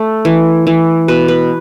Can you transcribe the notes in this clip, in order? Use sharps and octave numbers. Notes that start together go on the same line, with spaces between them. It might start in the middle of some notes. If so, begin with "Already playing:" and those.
Already playing: A3 A4
E3
E3
B2 B4
B4